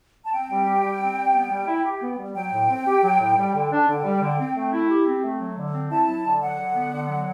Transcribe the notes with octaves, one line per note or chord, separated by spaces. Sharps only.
A5
C4 G5
G3
G4
G3
C4
G3
B3
G3
E4
G4
B3
G3
F#3 G5
A2
C4
G4
F#3
A2
G3
D3
D4
D3 G5
G3
D3
C4
A3
E4
G4
C4
A3
F#3
D3
C4
E4 A5
F#3
D3
F#3 F#5
D3
B3
D3
F#3